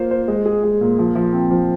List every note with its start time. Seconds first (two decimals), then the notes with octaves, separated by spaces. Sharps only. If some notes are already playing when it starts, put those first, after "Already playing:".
Already playing: A#3 F4 C5
0.11 C5
0.28 G#3
0.45 G#4
0.63 G#3
0.81 A#2
0.99 F3
1.15 F3
1.32 C4
1.51 F3